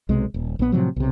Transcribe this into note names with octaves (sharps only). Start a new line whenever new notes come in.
B1 C3 G#3
D#1
A#1 B3
A2 C3 F3 F#3
B1 C3